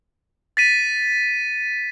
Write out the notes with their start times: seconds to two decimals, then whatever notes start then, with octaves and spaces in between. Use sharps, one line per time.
0.57 A6 B6 D#7